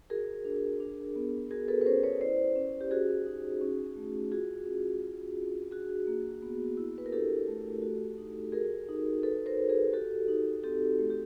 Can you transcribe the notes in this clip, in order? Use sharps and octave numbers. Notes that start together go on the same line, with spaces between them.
F#4 G#4 A#4
D4
D4
B3
F#4 G#4 A#4
A4 B4
B4
C#4 A#4 C5
B4 C#5
E4 C5 D5
C#4
G4
F#4 G#4
D#4
C#4
A3
F4 F#4 G#4
C#4
F4
D4
D4 F#4 G#4
A#3
B3
E4
B4
A#4
D4 G4 A4
A3
F#4
D#4
F#4 G#4 A#4
D#4
F#4 A4 B4
A#4 C5
D#4
G#4 A#4
F#4 G4 A4
D#4
C4 G4 A4
A3
G4